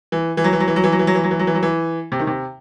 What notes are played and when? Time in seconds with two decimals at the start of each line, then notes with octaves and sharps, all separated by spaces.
0.12 E3
0.37 E3
0.44 F#3
0.53 E3
0.60 F#3
0.68 E3
0.76 F#3
0.84 E3
0.92 F#3
0.99 E3
1.07 F#3
1.15 E3
1.24 F#3
1.31 E3
1.39 F#3
1.47 E3
1.55 F#3
1.63 E3
2.12 C3
2.20 D#3
2.27 C3